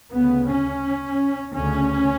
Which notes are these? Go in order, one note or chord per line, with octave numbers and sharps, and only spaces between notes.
D2 C#3 B3
C#4
D2 C#3 C#4